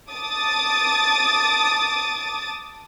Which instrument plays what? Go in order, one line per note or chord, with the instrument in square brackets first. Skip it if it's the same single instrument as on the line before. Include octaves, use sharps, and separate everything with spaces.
[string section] A5 D6 D#6 A6